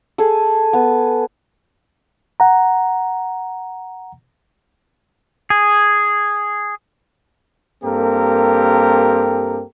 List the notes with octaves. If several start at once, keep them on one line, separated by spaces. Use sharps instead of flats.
G#4 A4
B3
F#5 A#5
G#4
G2 A#3 C4 G4 A4 A#4